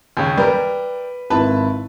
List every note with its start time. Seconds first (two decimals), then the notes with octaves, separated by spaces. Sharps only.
0.17 D#2 C#3
0.38 G3 A#4 B4
1.30 G#1 E4 B4 A5